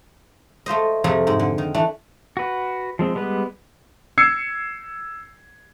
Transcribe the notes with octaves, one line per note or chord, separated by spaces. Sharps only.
A3 F4 C5 D#5
F2 C3 F3 A3 G#4 A4
G#2
D3
D#3
E3 A3 D4
F#4 B4
F3 G#3 C4
G3 G#3 B3 B4
E6 G#6 C7 C#7